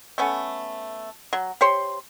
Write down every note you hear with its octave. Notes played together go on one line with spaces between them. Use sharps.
A3 B3 C#4
F#3
G4 C5 C#5 C6